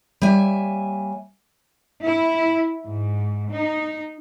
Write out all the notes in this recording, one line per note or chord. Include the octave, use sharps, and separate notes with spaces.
G3 A#3 C#5 E5 G#5
E4
G#2
D#4